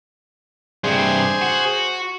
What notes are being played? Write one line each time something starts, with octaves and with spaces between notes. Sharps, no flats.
G2 C3 G#4 C5
F#4